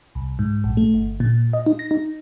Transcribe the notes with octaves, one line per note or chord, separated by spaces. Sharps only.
C2
G#2
A#1
A3
G1
A#2
D#5
D#4
A#6
D#4